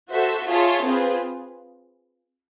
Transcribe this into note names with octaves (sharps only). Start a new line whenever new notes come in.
F#4 A4 C5 E5
F4 G#4 C#5 E5 A5
C4 F4 G#4 B4